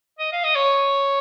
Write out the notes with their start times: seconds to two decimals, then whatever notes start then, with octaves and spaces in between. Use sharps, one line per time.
0.19 D#5
0.33 F5
0.44 D#5
0.56 C#5